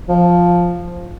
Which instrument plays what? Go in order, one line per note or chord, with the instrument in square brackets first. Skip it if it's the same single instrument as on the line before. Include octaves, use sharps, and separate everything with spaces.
[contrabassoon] F3